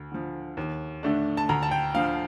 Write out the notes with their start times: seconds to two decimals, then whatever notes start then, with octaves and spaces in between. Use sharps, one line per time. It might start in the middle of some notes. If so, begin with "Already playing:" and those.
Already playing: D2
0.12 D3 F3
0.57 D#2
1.03 D3 A3 D4
1.37 A5
1.49 D2 A#5
1.63 A5
1.71 G5
1.94 D3 F3 F5